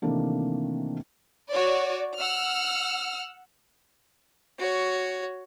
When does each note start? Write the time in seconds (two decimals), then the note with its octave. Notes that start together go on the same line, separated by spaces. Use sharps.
0.02 C3 D#3 E3 A3 A#3 D4
1.50 F#4 C#5 D5
2.18 F#5 E6 F6
4.59 F#4 C#5